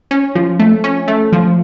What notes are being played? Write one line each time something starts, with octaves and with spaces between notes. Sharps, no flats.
C#4
F3
A3
C#4
A3
F3